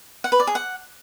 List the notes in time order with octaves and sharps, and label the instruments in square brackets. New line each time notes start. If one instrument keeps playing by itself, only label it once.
[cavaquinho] F#5
B4
D5
G#4
F#5